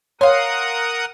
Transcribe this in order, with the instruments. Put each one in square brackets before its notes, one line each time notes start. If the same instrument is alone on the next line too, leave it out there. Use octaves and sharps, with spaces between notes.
[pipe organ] A#4 F#5 D#6 [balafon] C#5 [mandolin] F5 C6